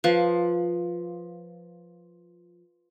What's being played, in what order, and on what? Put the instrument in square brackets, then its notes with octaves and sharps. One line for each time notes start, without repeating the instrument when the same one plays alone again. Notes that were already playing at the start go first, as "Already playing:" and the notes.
[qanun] F3 [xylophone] B4 F5